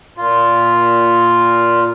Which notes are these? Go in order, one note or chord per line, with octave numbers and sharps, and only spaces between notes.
A#2 F4